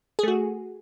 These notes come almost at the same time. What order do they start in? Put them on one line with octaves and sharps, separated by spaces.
G#4 A3 F#4